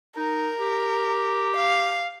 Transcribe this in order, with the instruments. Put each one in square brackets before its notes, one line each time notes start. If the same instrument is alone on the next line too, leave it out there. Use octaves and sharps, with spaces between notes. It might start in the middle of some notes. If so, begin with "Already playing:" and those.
[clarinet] D#4 [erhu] A#4
[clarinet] G4
[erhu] F5